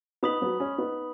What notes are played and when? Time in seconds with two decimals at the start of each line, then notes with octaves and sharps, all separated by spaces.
0.23 B3 D#4 B5 D#6 B6 F#7
0.42 F#3 B3
0.60 G#3 C#4
0.78 B3 D#4